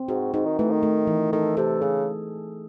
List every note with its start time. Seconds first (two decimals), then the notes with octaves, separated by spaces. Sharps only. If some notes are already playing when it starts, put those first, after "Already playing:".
Already playing: C4
0.08 G#2 F#4
0.34 G#2 D#4
0.46 D#3
0.58 E3 A3
0.71 D#3
0.83 A3
1.07 E3
1.32 D#3 A4
1.57 C3 A4
1.82 C#3 G#4